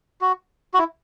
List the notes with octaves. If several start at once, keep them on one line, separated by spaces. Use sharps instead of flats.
F#4
F#4
E4